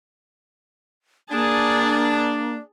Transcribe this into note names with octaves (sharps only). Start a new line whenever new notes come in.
A#3 D4 G#4 A5